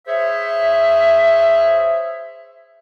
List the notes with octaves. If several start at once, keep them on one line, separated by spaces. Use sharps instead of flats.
G#4 C5 C#5 E5